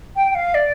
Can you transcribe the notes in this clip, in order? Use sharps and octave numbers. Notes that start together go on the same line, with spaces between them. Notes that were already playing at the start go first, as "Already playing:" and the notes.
G5
G5
F5
D5